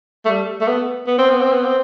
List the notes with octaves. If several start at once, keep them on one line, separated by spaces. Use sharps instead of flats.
A3
G3
A3
B3
B3
C4
B3
C4
B3
C4